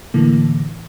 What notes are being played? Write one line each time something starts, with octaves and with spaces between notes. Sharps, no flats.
A2 D3 E3 A#3